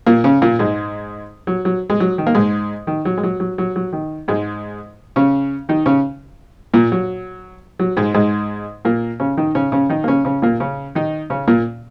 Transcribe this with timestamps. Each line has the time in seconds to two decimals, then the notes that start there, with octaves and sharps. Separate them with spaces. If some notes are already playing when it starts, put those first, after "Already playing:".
0.06 A#2 A#3
0.24 C#3 C#4
0.42 A#2 A#3
0.59 G#2 G#3
1.47 F#3
1.65 F#3
1.90 G#3
2.00 F#3
2.18 D#3
2.27 A#3
2.35 G#2 G#3
2.87 D#3
3.05 F#3
3.18 G#3
3.23 F#3
3.40 F#3
3.58 F#3
3.76 F#3
3.93 D#3
4.28 G#2 G#3
5.16 C#3 C#4
5.69 D#3 D#4
5.86 C#3 C#4
6.74 A#2 A#3
6.92 F#3
7.79 F#3
7.97 G#2 G#3
8.14 G#2 G#3
8.85 A#2 A#3
9.20 C#3 C#4
9.37 D#3 D#4
9.55 C#3 C#4
9.72 C#3 C#4
9.90 D#3 D#4
10.04 A#3
10.08 C#3 C#4
10.25 C#3 C#4
10.42 A#2 A#3
10.60 C#3 C#4
10.95 D#3 D#4
11.30 C#3 C#4
11.48 A#2 A#3